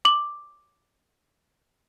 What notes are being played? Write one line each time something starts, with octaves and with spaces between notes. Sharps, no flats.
D6 F#7